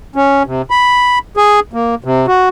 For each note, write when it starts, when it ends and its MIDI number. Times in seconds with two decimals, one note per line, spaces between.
0.16 0.43 61
0.47 0.62 48
0.70 1.19 83
1.37 1.60 68
1.73 1.95 58
2.04 2.26 48
2.27 2.49 66